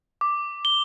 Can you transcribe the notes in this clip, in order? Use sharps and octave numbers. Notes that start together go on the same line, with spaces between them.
D6
G7